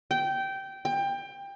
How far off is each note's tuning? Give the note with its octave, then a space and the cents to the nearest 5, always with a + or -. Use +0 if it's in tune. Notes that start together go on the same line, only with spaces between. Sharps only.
G5 -15
G5 +20